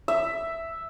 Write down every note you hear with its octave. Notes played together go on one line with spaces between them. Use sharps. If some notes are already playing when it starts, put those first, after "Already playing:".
E5